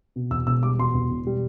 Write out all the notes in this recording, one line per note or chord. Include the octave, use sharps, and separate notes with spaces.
B2
E2 E6
E1 E6
G3 D6
B2 C6
E2
E1
G3